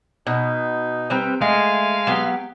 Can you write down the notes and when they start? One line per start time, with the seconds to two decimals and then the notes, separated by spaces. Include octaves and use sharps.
0.27 B2 D#4
1.10 G3 C4 B4 A#5
1.42 G#3 A3 F5 G#5
2.07 F#3 B3 G4